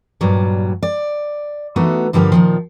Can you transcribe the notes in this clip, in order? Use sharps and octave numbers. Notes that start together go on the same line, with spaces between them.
G2 A#2 F#3 G3
D5
E3 A3 B3 D#4 F#4
G2 D3 F3 G3 A#3 G4
A#2 D#3 F3